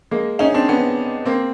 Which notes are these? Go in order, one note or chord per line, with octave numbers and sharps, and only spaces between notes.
G#3 A#3
C#4 D#4
C4 D4
B3 C#4
A#3 C4